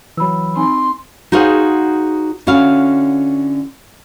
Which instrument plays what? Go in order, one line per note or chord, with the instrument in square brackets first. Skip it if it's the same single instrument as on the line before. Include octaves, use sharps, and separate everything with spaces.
[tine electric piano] E3 F#3 [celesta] B5 E6
[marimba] C4 D#4 G#5 [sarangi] C6
[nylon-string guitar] D#4 F#4 G#4 C5 F5
D3 C#4 E4 F#4 F5